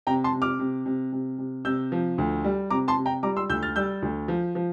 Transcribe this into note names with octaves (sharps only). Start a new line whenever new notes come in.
C3 G5 A#5
A5 C6
C3
D6 F6
C3
C3
C3
C3
C3 E6 G6
F3
D2
G3
C3 A#5 D6
A5 C6
C3
G5 A#5
G3 A#5 D6
C6 E6
D2 E6 G6
F6 A6
G3 E6 G6
D2
F3
F3